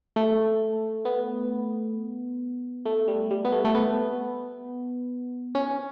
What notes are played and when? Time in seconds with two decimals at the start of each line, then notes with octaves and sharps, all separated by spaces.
0.16 A3
1.05 B3
2.86 A3
3.08 G3
3.31 G3
3.45 B3
3.52 A3
3.65 A3
3.75 B3
5.55 C#4